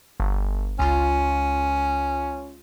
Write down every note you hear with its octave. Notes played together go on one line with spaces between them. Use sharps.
G1
C#2 C#4 F4